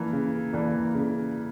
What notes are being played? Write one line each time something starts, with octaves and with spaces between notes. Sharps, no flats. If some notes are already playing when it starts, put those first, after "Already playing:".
Already playing: E3 A#3 D4
C#3
E3 A#3 D4
C#3